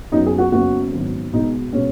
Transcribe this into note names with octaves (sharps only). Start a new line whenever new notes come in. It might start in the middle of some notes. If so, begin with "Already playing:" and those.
F#2 F#3 B3 D#4
G#4
F#4
F#1 F#2 F#3 B3 F#4
G#1 G#2 F#3 B3
B1 B2 G#3 B3 D#4
B2 G#3 B3 C#4